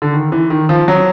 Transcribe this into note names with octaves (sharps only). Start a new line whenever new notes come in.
D3
D#3
E3
D#3
F3
F#3